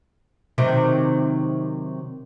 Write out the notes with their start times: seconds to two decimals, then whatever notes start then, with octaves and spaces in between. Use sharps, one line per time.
0.58 C3 D#3 F#3